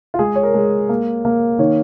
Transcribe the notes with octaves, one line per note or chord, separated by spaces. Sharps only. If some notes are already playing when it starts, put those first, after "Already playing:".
F4
G#3 G#4
C#5
A#4
G#3
A#3
A#3
D#3 C#5